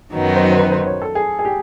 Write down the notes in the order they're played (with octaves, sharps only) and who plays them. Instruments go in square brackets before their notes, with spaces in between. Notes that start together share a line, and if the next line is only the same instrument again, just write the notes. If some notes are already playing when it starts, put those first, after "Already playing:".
[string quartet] F#2 D#3 F#3 B3 D#4
[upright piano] C5
C5
B4
C5
C#5
A4
G#4
G#4
G4